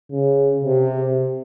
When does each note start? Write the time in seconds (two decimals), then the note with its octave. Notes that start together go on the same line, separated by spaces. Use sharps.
0.12 C#3
0.65 C3